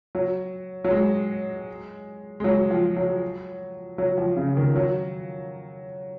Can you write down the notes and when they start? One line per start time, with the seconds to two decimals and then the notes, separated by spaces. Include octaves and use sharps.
0.15 F#3
0.84 F#3
0.91 G#3
2.40 G#3
2.44 F#3
2.71 F3
2.96 F#3
3.98 F#3
4.18 F3
4.36 C#3
4.57 D#3
4.76 F#3